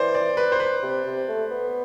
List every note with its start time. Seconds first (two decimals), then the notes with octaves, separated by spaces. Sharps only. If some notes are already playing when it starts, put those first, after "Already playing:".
Already playing: E3 C5 D5
0.14 D5
0.37 B4
0.52 C5
0.60 B4
0.83 C3
1.06 C3
1.29 A3
1.51 B3